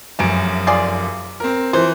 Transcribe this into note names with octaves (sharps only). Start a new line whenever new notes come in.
F1 F#2 E3 D7
F4 G#4 D5
C4 A#4
E3 F3 C5